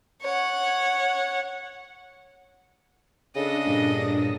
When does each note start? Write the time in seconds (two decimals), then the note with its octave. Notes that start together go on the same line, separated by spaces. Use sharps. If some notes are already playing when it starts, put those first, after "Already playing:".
0.23 C#5 F#5
3.35 C#3 D4 A4 D#5 D#6 A#6
3.66 G2 A#2